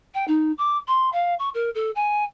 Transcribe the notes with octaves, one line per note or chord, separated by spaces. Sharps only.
G5
D#4
D6
C6
F5
C#6
A#4
A4
G#5